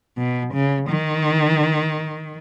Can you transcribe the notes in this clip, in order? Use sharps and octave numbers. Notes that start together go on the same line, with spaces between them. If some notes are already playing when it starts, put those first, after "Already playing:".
B2
C#3
D#3